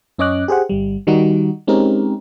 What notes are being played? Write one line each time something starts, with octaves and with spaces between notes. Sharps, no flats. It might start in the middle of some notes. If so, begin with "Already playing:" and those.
F#2 C#4 C#5 D#5 D6 F#6
G4 G#4 C5 F#5
G1 G3
D#3 G3 D#4 F#4
G#3 C4 C#4 D#4 G4 A#4